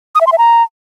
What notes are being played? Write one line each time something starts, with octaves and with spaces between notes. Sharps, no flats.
D#6
E5
C6
E5
A#5